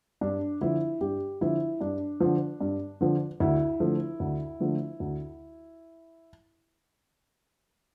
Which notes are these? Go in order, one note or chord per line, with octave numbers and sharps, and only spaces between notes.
G2 D4
D3 F3 E4
G2 G4
D3 F3 E4
G2 D4
D3 F3
G2
D3 F3
D2 E4
D3 F3 A3
D2
D3 F3 A3
D2